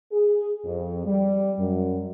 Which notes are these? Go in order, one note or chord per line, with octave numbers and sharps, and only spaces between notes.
G#4
F2
G3
F#2